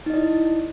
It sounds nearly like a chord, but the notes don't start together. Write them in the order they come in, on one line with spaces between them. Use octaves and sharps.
D#4 D#5 D5 E4